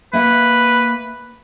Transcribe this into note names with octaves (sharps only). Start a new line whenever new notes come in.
A#3 B4 E5 F#5